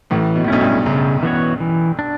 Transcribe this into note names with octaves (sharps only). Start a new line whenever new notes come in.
A1 A2 E3
B2
A2
B1 B2 A3 C#4 E4
G2
F#2 C#3
E3 B3 F#4 C#5
E3
D4